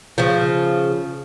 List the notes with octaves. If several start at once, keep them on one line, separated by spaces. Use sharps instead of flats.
C#3 F3